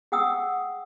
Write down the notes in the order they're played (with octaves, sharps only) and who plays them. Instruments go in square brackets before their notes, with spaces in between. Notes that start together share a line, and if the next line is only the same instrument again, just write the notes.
[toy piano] G#4 F#5 G5 D#6 E6